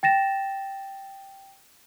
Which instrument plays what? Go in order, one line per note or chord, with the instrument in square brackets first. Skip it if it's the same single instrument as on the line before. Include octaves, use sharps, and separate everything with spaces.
[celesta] G5 A6 A#6 E7